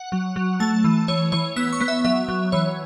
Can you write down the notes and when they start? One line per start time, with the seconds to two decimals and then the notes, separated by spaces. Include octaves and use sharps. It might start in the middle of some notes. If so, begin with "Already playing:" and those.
Already playing: F#5
0.12 F#3
0.36 F#3
0.60 A3 A5
0.84 E3
1.08 E3 C#5
1.32 E3 C#5
1.56 B3 E6
1.73 C#6
1.80 B3
1.88 E5
2.05 F#3 E5
2.29 F#3
2.52 E3 C#5